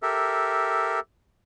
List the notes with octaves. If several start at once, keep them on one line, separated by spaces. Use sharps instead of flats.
G4 A4 A#4 E5